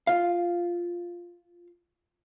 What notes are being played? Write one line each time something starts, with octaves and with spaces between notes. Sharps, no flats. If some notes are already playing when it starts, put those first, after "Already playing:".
F4 F5